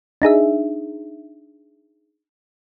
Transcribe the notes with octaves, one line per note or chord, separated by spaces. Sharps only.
D4 D#4 G#4 E5